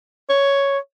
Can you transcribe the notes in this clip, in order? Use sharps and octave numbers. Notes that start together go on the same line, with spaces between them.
C#5